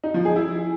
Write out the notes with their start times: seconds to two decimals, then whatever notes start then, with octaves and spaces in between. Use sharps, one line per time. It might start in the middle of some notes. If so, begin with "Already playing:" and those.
0.04 D#4
0.14 F3
0.25 G#4
0.36 E4